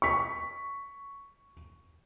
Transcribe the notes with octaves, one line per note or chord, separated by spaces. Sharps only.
C#6 B6